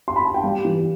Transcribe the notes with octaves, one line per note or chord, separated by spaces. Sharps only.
C6
B5
A5
G5
G3 F5
E3